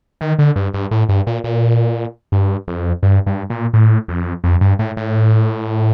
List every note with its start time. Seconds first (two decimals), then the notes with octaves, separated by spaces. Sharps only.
0.21 D#3
0.39 D3
0.56 G2
0.74 G2
0.91 A2
1.09 G2
1.27 A#2
1.44 A#2
2.32 G2
2.68 F2
3.03 G2
3.26 G2
3.50 A#2
3.74 A2
4.08 F2
4.44 F2
4.61 G2
4.79 A2
4.97 A2